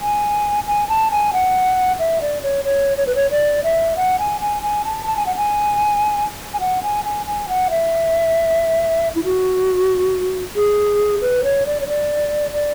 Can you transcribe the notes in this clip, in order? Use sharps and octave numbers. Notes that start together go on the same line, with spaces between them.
G#5
G#5
A5
G#5
F#5
E5
D5
C#5
C#5
C#5
B4
C#5
D5
E5
F#5
G#5
G#5
G#5
A5
A5
G#5
F#5
G#5
G#5
F#5
G#5
G#5
G#5
F#5
E5
E4
F#4
G#4
B4
C#5
D5
C#5
D5
D5